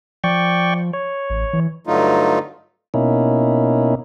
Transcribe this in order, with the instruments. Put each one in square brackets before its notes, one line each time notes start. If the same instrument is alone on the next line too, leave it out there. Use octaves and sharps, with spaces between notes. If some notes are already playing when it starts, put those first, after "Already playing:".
[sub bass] F3 [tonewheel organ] D5 G5 C#6
[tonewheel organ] C#5
[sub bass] A1
E3
[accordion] G2 D3 F#3 A3 D#4 F4
[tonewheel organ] B2 A#3 C#4 D#4 E4